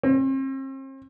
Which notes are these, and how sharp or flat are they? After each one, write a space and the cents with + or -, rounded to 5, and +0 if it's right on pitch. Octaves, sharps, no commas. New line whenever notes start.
C4 +40